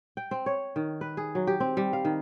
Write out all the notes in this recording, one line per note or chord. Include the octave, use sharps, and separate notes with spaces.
G5
C4
C#5
D#3
B4
G#4
F#3
G4
C4
G3
F5
D#3